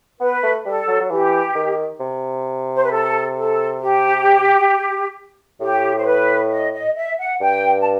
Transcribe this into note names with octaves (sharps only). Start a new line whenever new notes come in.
B3 B4
A3
G3 A4
F#3
F#3
E3 G4
D#3
C3
C5
B4
A4
A4
G4
A2 G4
C5
B4
D#5
D#5
E5
F#5
G2 G5
A5